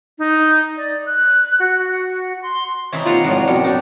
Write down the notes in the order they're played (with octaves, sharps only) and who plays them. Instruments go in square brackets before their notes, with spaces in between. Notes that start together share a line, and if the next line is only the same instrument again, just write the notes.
[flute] D#4
D5
F#6
F#4
C6
[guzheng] C3 E3 C4 [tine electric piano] C#5 D#5 A#5
[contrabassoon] D#2 [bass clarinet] F4 [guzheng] D5 F#5 G#5
[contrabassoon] G#1 [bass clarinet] A2 [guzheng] F3 G3 F#4
[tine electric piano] F#2 C#7 [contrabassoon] B2 [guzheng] G3
[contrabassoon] B2 [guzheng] D4 D#4